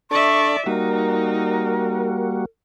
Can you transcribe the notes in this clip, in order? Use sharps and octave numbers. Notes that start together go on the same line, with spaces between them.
D4 A4 D5 E5 C#6
G3 A#3 D#4 F#4 A#4